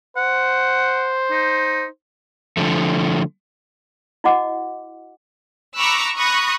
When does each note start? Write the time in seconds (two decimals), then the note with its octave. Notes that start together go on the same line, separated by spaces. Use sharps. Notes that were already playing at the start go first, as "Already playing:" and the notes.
0.17 C5 F#5
1.31 D#4
2.57 D3 F3 A3
4.24 E4 F#4 D#5 F#5 D6
5.78 A#5 B5 C#6 D6 E6 F#6
6.17 A#5 B5 C#6 D#6 F#6 A#6